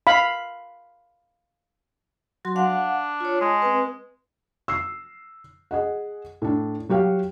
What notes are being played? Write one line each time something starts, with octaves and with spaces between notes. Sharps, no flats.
F5 B5
F#3 F#4 C6
D4 F5 F#5
F4 C#5
G#3 A5
C4 B4
E6 C7
G#4 D#5 F#5
A2 D4
F#3 F#4 G4 F5